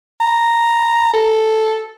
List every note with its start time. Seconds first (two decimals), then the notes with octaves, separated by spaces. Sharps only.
0.21 A#5
1.14 A4